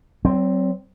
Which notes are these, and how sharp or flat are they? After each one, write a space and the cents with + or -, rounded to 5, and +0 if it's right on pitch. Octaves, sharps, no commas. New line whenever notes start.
F#3 +40 C4 +0